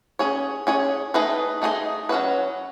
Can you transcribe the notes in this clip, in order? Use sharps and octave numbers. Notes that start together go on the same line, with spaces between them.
C#4 G#4 C#5
C#4 G#4 C#5
A3 D#4 G#4 B4 D#5
A3 D#4 G#4 B4 D#5
F#3 C#4 F#4 B4